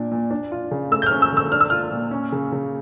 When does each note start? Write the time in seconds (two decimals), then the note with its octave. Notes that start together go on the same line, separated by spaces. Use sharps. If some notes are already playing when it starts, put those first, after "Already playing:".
Already playing: A#2 D4
0.11 A#2
0.31 D4
0.52 F4
0.71 C#3
0.91 A3 E6
1.02 G6
1.06 C#4 F6
1.22 E6
1.32 D3 E6
1.52 D4 F6
1.61 E6
1.70 F4 F6
1.91 A#2
2.11 C#4
2.32 C#3
2.52 C#3